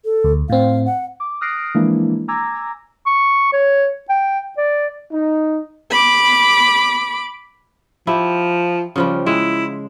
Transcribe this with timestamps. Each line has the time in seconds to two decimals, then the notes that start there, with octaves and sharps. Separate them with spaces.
0.05 A4
0.24 D2
0.50 A2 C4 F5
0.86 F#5
1.20 D6
1.41 D#6 F6 F#6 A#6 C7 D7
1.75 E3 F3 G#3 A#3 D4 E4
2.28 G#5 A#5 D6 E6 G#6 A#6
3.06 C#6
3.53 C#5
4.09 G5
4.58 D5
5.11 D#4
5.91 B5 D6
8.07 F3 E4 G4
8.96 C#3 F3 G3
9.26 G#3 E4